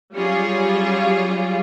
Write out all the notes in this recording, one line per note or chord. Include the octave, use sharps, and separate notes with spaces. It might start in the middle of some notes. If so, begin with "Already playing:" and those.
F#3 G3 C#4 F4 G#4